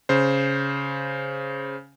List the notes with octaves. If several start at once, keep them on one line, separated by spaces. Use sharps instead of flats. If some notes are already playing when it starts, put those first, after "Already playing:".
C#3 C5